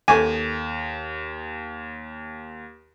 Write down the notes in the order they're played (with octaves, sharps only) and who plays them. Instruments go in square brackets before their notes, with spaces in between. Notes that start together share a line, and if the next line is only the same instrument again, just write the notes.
[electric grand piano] D#2 [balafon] A4 C#6 D6 [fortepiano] G#5